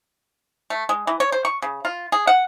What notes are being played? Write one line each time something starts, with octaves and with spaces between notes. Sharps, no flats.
A3
G#3
E3
C#5
C5
C#6
C#3
F4
G#4
F#5